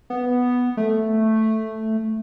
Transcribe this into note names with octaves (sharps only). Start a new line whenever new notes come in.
B3
A3